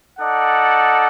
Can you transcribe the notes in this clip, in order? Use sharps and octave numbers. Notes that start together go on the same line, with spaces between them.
D#4 A4 D5 F#5